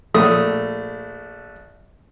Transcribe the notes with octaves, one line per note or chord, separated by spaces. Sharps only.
A#1 A3 D#6